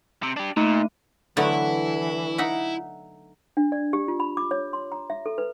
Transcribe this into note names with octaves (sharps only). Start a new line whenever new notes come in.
C3
D4 G4
A#2 A3 D#4
D3 E3 F#3 A3 B3 E4
D#4 E5 F#5
D4
D5
G4
F4
B5
D6
C#5
C6
A#5
E5
A4
B4